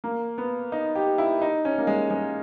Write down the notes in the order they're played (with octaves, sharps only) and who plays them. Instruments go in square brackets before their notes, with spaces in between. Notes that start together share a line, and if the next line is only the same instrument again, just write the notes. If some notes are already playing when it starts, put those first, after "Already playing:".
[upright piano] A#3
B3
D#4
G4
E4
D#4
C#4
A#3
G#3
G#3